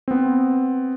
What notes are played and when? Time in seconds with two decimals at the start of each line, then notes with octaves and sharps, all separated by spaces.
0.08 B3 C4